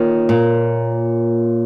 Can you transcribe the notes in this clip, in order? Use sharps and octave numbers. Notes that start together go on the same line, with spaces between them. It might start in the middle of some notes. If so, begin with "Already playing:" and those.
Already playing: D#3 A#3 F4 A#4 C#5
A#2